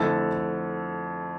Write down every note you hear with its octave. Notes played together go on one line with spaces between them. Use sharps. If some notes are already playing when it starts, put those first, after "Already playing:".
Already playing: F2 D3 A3 E4 A4